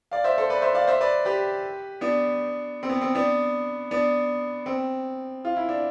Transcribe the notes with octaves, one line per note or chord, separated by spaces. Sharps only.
D5 F5
C5 E5
A4 C5
B4 D5
C5 E5
D5 F5
C5 E5
B4 D5
G4 B4
B3 D4
C4
B3
C4
B3 D4
B3 D4
C4
F4
E4
D4